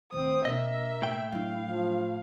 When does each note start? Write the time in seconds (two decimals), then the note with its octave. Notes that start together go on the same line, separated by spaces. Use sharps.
0.12 D1 D#3 C4 C5 D#6
0.45 B2 A#3 D4 D#5 E5
1.02 A2 G5
1.32 F#3 D4 E4 F5
1.65 F3